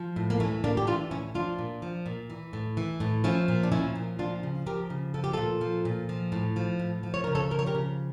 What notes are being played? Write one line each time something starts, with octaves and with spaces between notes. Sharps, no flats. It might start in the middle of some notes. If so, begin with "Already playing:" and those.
Already playing: F3
A2
A#3
E3 A3 C#4
A2 A#3 D4
G4
E3 D4 F4
A2 C#4 E4
F3 D4 F4
A#2
F3
A#2
E3
A2
E3
A2
F3 C#4 E4
A#2
D4
F3 C#4 E4
A#2
F3 D4 F4
C#3
F3 G4 A#4
C#3
F3 A4
G4
A#2 F4 A4
F3
A#2
F3
A2
F3
A2
F3
C#5
C#3 A#4
A4 C#5
F3 A#4
C#5
G4 A#4
C#3